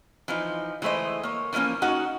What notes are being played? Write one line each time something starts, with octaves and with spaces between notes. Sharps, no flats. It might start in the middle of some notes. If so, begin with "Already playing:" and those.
E3 F3 D#4
E3 G#3 A3 C5 D#5
A#3 C#5
E3 F3 G#3 A#3 C#4
C#4 D#4 F#4 F#5